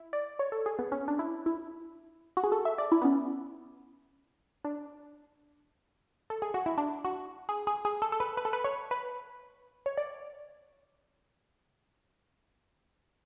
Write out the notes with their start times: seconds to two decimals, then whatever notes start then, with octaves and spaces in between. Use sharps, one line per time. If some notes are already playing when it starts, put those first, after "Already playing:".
Already playing: E4
0.13 D5
0.39 C#5
0.52 A4
0.66 G#4
0.79 B3
0.92 C#4
1.08 D4
1.19 E4
1.46 E4
2.37 F#4
2.44 G#4
2.52 A4
2.65 E5
2.78 D5
2.92 E4
3.02 B3
3.05 C#4
4.64 D4
6.30 A4
6.42 G#4
6.54 F#4
6.66 E4
6.78 D4
7.05 F#4
7.49 G#4
7.67 G#4
7.85 G#4
8.02 A4
8.12 A4
8.20 B4
8.37 B4
8.45 A4
8.53 B4
8.64 C#5
8.91 B4
9.86 C#5
9.97 D5